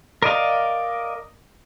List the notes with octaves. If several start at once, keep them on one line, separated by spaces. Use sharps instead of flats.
A#4 D5 D#5 F5